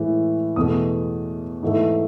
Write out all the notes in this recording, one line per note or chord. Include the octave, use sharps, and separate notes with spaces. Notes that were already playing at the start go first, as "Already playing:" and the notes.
Already playing: A2 E3 G#3
E2 B2 A3 D#6
G#2 E3 A3